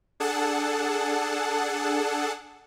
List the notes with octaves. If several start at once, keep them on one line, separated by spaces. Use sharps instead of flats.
D4 G#4 A4 F#5 A5